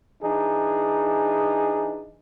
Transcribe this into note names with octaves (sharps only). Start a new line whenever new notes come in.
E3 D4 D#4 G#4